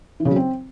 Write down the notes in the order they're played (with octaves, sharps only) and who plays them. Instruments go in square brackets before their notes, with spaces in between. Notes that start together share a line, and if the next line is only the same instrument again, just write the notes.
[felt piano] E3
C#3
F#3
C4